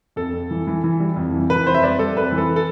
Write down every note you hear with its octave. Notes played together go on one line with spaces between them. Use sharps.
F2 A4
F2
E3
E3
E3
G3
F2
E3
E3 B4
F2 C5
E5
G3 D5
G3 A4
F2 B4
E3
A4
A4